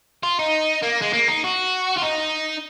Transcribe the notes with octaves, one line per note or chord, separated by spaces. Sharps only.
F4
D#4
A#3
G#3
A#3
D#4
F#4
F4
D#4